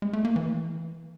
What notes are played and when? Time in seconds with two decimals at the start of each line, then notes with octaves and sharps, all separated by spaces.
0.02 G#3
0.13 A3
0.25 A#3
0.36 E3